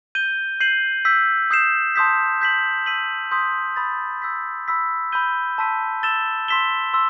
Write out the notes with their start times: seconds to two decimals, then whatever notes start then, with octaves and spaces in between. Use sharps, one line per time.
0.15 G6 D#7 G7
0.60 G6 C7 D#7 F#7
1.05 E6 G6 B6
1.51 D#6 G6 C7 E7
1.95 A5 C6 D#6 G6 B6
2.41 G6 B6 F#7
2.86 E6 B6 D#7 F#7
3.31 C6 D#6 G6 B6
3.76 B5 D#6 A6
4.22 E6 G6 B6
4.68 B5 E6 B6
5.12 B5 E6 G6 D#7 G7
5.58 A5 C6 E6 B6 D#7
6.03 E6 A6 E7 G7
6.48 C6 E6 B6 E7 G7
6.93 C6 E6